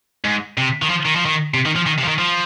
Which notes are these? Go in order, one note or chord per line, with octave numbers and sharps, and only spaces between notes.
G#2
C3
D#3
F3
D#3
F3
D#3
C3
D#3
F3
D#3
C3
F3
D#3
F3